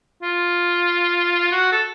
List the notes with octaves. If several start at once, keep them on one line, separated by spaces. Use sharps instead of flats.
F4
F#4
A4